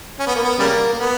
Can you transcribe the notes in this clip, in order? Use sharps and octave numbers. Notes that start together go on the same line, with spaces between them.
C#4
B3
A#3
B3
C#3 G3 A#3
A#3
B3